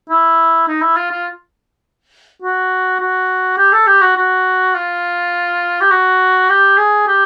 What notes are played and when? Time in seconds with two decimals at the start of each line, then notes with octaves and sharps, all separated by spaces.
0.09 E4
0.68 D#4
0.81 E4
0.96 F4
1.10 F4
2.42 F#4
3.00 F#4
3.57 G4
3.73 A4
3.86 G4
4.01 F#4
4.16 F#4
4.75 F4
5.81 G4
5.90 F#4
6.49 G4
6.77 G#4
7.07 G4